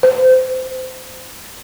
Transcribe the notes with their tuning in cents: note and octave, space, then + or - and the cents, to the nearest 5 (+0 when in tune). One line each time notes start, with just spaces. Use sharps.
C5 -25